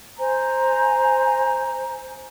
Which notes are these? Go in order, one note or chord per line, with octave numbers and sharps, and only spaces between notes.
C5 G#5 A#5